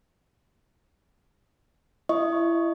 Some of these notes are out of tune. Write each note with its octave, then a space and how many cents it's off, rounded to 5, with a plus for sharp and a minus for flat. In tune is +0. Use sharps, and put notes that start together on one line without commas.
E4 +25 D#5 +0 C#6 +0